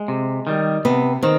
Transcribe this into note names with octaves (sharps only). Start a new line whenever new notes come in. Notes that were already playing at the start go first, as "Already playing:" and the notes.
Already playing: G#3
C3
D#3 G3
C3 B3
D#3 C4